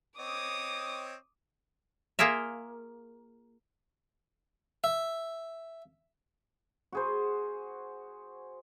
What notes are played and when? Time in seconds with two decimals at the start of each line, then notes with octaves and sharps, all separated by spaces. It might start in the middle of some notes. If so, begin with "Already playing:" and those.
0.19 C4 C#5 D#5 D6 D#6
2.19 A#3 F4 G#4 A#4 E5
4.84 E5
6.92 F#4 G#4 C5